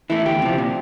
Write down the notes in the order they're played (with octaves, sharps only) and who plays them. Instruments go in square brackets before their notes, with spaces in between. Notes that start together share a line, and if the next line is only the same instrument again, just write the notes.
[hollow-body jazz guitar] E3 A3 E4
D2 G4
C3 F3
A#2